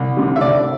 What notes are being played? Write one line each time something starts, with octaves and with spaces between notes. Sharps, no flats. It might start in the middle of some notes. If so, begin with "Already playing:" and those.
Already playing: C2
C3 G3
E5
C2 D5